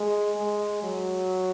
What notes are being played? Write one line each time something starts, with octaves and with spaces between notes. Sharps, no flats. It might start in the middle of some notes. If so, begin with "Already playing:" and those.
Already playing: G#3
G#3
F#3